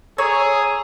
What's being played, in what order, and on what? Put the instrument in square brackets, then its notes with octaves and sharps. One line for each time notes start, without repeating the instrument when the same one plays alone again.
[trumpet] G#4 [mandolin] C#5 [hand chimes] A#5 E6